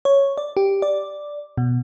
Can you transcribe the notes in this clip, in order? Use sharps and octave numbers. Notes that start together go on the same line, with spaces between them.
C#5
D5
G4
D5
B2